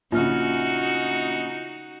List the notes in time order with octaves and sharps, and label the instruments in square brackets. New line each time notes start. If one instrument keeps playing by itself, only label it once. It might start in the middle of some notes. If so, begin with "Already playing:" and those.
[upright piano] A#1 C#3 [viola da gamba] D#4 F#4 [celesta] F4 F6